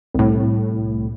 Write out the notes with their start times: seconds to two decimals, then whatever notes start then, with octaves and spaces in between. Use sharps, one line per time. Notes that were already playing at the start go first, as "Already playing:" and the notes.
0.14 C2 A2